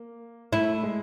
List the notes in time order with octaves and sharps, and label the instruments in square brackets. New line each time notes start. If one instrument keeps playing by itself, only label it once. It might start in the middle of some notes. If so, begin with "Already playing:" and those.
Already playing: [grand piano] A#3
[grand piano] A3 [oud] E4
[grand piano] G#3